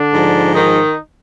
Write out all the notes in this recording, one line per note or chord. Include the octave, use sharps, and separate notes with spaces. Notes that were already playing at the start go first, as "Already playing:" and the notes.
Already playing: D3 D4
G#2 F3
D#3 D#4